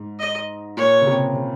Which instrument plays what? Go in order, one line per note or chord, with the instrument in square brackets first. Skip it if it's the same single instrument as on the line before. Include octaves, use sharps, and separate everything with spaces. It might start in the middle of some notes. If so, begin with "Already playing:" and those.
Already playing: [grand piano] G#2
[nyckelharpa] D#5
[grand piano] A#2 [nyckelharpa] C#5
[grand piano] C#3
C3
C#3